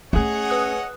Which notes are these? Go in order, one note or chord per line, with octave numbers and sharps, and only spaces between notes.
A3 C#4 G#4 C#5 D#5 F#5
B4 D#6 F#6